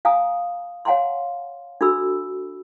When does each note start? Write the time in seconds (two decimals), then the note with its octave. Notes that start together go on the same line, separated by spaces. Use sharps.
0.05 F5 G#5 A#5 D#6
0.85 C#5 F5 F#5 G#5 A#5 C6
1.81 D4 F#4 A4 B5 E6